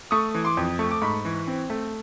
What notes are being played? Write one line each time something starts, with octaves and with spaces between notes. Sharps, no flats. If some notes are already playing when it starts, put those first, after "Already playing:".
A3 C#6 D#6
E3
C6 D6
F2
A3 C#6
D6
G#2 B5 C#6
E3
C4
A3